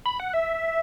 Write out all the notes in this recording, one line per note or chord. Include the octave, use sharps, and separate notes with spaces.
B5
F#5
E5